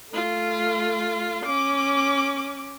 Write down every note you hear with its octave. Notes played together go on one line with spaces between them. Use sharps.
A3 F4
C#4 D6